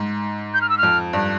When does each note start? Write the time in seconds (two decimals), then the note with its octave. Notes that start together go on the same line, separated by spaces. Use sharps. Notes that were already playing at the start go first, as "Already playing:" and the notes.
Already playing: G#2
0.54 G6
0.61 F6
0.69 E6
0.78 F6
0.83 F2
1.13 G2